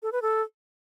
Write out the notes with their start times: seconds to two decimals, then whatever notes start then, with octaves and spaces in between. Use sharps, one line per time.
0.02 A4
0.12 B4
0.22 A4